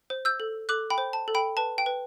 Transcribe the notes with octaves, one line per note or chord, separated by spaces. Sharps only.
C5
E6 G6
A4
A4 D6 F#6
G5 B5
C5
A5
A4
G5 B5
B4 A5
G5
B4